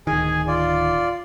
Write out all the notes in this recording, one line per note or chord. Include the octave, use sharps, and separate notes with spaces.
D1 D#3 G#4 G#5
F4 D5